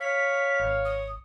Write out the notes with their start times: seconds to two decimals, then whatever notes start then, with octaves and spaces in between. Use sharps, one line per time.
0.01 C#5 F5 B6
0.60 G#1
0.85 D#6